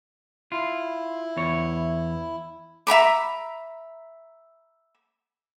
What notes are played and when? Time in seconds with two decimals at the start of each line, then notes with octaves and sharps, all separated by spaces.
0.52 E4 F4
1.37 E2 C#5
2.87 E5 A#5 B5 D6